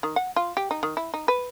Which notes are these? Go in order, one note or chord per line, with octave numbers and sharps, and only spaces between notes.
D#3
F#5
F4
G4
D#4
D#3
E4
D#4
B4